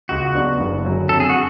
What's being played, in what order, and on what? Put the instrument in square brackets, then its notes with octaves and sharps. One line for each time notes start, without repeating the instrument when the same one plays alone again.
[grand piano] C#2 [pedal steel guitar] F#4
[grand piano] C#3 F#3 B3 D4
F#1
F#2 D3 F#3 C#4
[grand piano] F2 [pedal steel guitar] A4
[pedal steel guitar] G#4
F#4